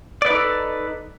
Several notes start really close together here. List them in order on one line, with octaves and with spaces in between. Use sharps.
D5 B4 D#4 A4